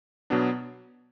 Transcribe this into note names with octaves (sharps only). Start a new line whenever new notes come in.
B2 F#3 B3 D4